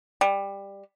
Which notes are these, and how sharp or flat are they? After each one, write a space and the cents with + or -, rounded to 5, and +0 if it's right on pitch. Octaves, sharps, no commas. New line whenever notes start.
G3 +15